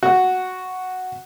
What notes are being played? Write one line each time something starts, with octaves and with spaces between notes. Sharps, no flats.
F#4